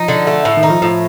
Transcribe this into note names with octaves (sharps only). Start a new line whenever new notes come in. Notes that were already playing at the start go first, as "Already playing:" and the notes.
Already playing: F3 D#4
D3
A3
A2
D#3
D#4
F3
A2 F3